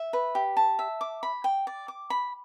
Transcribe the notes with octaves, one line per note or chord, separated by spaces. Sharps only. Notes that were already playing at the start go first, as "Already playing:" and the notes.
Already playing: E5
B4
G4
A5
E5
D6
B5
G5
D5
D6
B5